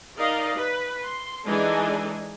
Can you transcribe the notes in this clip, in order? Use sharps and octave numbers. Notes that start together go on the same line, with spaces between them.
D#4 A#4 D5 D#5 F5
B4
C6
E3 G#3 D4 D#4 A4 G#5